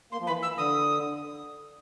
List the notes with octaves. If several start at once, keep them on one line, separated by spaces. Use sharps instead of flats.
A#3 C6
F3
E3 B5
E3 E6
D3 D#6